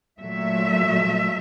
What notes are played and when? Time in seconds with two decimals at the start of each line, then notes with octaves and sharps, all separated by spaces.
0.21 A#2 F#3 A3 E5